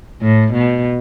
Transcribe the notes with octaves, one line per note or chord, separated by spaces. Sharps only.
A2
B2